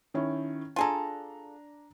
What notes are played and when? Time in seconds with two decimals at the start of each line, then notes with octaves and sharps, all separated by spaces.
0.14 D#3 C#4 E4
0.76 D4 F4 G#4 A4 A#5